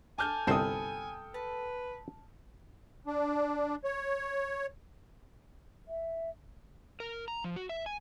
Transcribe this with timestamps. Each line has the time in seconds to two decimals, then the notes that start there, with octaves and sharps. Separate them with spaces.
0.18 A4 C5 G#5 A5 D6 F6 G6
0.47 G1 C2 A4 C5 G5 A5 B5 D#6
1.34 B4 A5
3.07 D4
3.84 C#5
5.88 E5
7.00 A#4
7.28 A#5
7.44 F3
7.56 F#4
7.69 E5
7.86 G#5